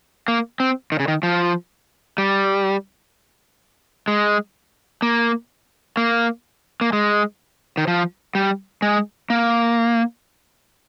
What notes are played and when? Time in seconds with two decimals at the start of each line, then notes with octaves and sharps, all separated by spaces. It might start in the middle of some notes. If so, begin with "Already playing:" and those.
0.28 A#3
0.60 C4
0.92 D#3
1.00 C#3
1.08 D#3
1.23 F3
2.18 G3
4.08 G#3
5.02 A#3
5.97 A#3
6.81 A#3
6.93 G#3
7.77 D#3
7.88 F3
8.35 G3
8.82 G#3
9.30 A#3